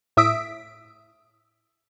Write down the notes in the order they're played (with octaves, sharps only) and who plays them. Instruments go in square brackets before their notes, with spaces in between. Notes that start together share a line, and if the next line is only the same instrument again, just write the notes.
[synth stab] A2 E5 D#6 E6 B6 D7